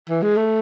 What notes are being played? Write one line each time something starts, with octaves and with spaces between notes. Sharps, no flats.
E3
G#3
A3